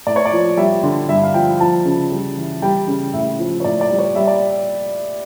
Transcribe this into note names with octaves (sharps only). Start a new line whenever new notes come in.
A2 D5
C#5
D5
F3
G3 E5
D3
G2 E5
F5
F3 G5
F3 A5
C#3
G3
E3
G3 G5
C#3
A2 E5
F3
C#5
A2 D5
D5
G3
C#5
G3 E5
D5